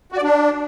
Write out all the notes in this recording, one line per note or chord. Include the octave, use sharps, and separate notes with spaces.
F#4
D5
D4